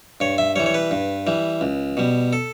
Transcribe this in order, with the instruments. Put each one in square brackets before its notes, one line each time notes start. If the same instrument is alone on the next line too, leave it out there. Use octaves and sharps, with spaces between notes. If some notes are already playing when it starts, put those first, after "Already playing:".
[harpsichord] G2 C#5
E5
G3 C#5
E3
C#5
B4
G2
E3 G3
C#2
B2 G3
A4